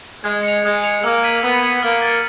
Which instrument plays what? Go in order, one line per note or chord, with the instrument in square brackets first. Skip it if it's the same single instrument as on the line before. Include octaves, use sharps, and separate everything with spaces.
[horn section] G#3 [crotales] G#6
[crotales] C#7 F7
[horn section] G#3 [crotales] G#6
[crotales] C#7 F7
[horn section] A#3 [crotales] E6
[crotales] G#6 B6 D#7 F#7
[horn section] B3 [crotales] E6
[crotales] G#6 B6 D#7 F#7
[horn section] A#3 [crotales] F6
[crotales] A6
C#7